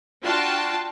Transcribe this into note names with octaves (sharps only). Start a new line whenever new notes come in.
D4 F4 F#4 G5 A5 C6